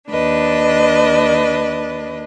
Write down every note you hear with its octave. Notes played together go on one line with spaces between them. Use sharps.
D#2 D4 B4 D#5